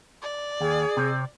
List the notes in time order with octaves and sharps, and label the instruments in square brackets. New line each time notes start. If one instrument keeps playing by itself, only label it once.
[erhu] D5
[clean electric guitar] D#2 [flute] G#4
[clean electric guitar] C3 C4